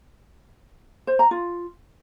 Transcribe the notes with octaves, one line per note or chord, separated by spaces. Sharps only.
C5
A#5
F4